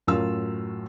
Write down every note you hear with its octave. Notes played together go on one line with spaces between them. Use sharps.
F#2 A2 F#3 F4 A#4 E6